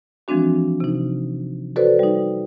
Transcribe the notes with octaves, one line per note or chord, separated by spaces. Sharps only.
E3 F3 G#3 C4 D4 F#4
C3 D#4
F#4 A4 B4 C5 D5
G3 D#4